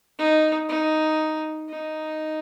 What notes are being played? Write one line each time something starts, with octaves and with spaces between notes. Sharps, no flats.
D#4
D#4
D#4